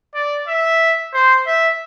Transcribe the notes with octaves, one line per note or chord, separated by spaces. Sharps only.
D5
E5
C5
E5